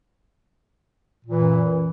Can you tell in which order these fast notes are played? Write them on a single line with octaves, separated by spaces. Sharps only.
A#2 E3 F#2